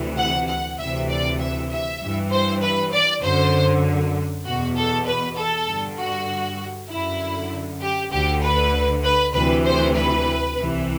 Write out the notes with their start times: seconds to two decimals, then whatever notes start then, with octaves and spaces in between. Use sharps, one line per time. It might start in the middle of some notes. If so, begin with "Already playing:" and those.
Already playing: D2 C3 E3
0.17 F#5
0.48 F#5
0.78 D2 C3 E3 E5
1.09 D5
1.39 E5
1.70 E5
2.01 G2 E3
2.31 C5
2.61 B4
2.92 D5
3.22 F#2 D3 C5
4.45 E2 B2 F#4
4.76 A4
5.06 B4
5.37 A4
5.67 G2 D3
5.98 F#4
6.89 F#2 D3 E4
7.81 G4
8.11 D2 D3 G4
8.42 B4
9.03 B4
9.34 D2 C3 E3 B4
9.64 C5
9.95 B4
10.56 C2 C3 E3